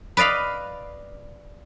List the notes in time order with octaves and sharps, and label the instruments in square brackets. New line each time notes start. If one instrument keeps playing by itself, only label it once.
[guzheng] B4 D5 D#5 F5 B5